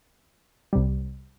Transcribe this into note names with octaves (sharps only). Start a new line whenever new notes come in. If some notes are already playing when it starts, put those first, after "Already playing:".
C2 C3 G3